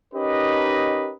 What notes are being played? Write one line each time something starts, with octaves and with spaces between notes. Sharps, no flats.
C#4 D#4 G4 A#4 B4 D#5